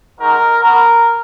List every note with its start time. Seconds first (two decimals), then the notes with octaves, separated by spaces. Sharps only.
0.18 G#3 D#4 F#4 A#4
0.61 B3 F#4 A#4